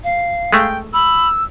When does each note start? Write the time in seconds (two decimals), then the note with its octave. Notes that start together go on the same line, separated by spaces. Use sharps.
0.04 F5
0.53 G#3 A3 G5
0.93 B5 E6